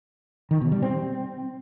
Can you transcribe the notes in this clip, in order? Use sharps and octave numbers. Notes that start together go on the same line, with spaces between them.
D#3
B2
G3
C4